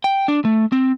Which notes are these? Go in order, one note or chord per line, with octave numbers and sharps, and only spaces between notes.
G5
D4
A3
C4